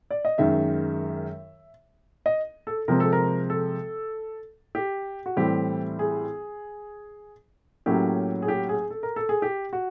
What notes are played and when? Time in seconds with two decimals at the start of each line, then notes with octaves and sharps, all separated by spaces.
0.10 D5
0.25 D#5
0.38 F#2 D#3 G#3 E5
2.26 D#5
2.67 A4
2.88 C3 F3 G#3 C4 A#4
3.00 A4
3.13 A#4
3.50 A4
4.75 G4
5.26 F#4
5.37 A2 E3 G3 C4 G4
5.99 G#4
7.86 A2 F#3 A#3 C#4 G4
8.42 G#4
8.48 G4
8.69 G#4
8.90 A4
9.03 A#4
9.16 A4
9.29 G#4
9.42 G4
9.73 F#4